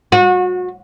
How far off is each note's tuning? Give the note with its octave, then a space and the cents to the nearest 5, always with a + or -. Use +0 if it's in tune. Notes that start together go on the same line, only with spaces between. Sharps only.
F#4 -30